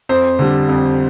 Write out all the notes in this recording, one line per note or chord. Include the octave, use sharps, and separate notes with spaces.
F2 C5
D3 G3
F2